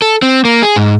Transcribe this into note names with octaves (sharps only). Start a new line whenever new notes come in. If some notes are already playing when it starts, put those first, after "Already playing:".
A4
C4
A#3
G#4
G#2